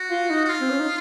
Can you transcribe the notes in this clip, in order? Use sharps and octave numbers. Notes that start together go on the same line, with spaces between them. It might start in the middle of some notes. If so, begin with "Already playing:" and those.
Already playing: F#4
F4
D#4
F#4
F4
C4
C#4
D#4